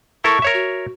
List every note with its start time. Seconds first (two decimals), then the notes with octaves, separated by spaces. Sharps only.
0.24 E4 A4 A#4 C#6
0.42 A#4 C#5 E5
0.54 F#4